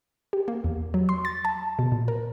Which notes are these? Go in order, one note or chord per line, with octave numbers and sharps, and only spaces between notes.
G4
A#3
E2
F#3
C6
A6
A5
B2
A#2
A#4